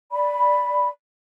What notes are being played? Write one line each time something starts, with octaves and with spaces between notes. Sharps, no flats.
D5 B5